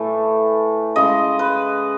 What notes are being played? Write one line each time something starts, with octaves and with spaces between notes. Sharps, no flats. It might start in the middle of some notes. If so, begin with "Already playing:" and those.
Already playing: A2 E3 A3
C#3 G#3 D#5
B4